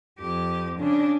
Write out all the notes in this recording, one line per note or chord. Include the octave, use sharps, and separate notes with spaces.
F2 G4
C#3 D4